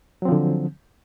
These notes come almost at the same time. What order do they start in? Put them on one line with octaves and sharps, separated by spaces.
F#3 C4 F3 D3